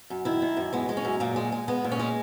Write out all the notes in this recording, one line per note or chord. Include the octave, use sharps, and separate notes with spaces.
F#2
D#3 E4
D#3
F#2
G#3 B3
G#3
C#4
F#2
A#2 A#3
G#3
G#3
G#3 B3
A#2
C#4
G#3